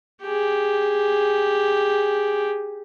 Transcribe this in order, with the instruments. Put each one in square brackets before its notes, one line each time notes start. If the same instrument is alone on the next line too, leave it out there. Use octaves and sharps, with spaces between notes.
[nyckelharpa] G4 G#4